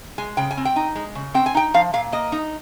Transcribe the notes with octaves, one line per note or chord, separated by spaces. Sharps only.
G#3 G#5
C#3 G5
G#5
C4
G5
D#4
G#3
C#3
C4 G5
G#5
D#4 G5
F3 F5
A#2 F5
A#3 D#5
D#4